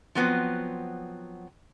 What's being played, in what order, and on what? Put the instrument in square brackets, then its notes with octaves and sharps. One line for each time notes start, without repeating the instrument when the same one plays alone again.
[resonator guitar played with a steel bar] F3 F#3 B3 C4